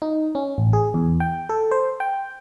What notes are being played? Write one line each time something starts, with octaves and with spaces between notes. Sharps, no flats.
D#4
C#4
A1
G#4
E2
G5
A4
C5
G5